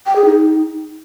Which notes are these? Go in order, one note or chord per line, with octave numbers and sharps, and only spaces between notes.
G5
G#4
D#4